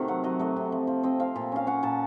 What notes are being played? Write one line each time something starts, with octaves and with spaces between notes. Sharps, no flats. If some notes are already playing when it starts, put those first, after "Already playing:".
Already playing: C3 D#3 A3 C4 F#4 A#4
F#3 F#5
F#3 D#5
A3 D#5
C3
F3
F3
C4 D#5
C4 F5
A#2
C#4 F5
C#4 F#5
A#2 A5